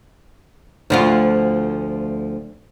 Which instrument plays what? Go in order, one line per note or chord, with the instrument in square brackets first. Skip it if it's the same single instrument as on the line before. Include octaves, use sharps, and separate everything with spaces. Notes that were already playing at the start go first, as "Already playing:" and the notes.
[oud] D2 F3 F4